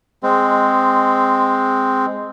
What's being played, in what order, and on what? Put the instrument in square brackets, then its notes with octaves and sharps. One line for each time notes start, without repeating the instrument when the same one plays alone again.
[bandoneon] G#3 C4